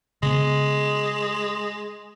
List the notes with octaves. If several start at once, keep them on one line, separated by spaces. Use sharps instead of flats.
C#3 G#3 B3